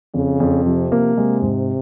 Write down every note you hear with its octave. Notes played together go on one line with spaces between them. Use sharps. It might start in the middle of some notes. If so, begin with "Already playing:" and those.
F2 C#3
F2
C3 F3
A#3
C3 G#3
G#2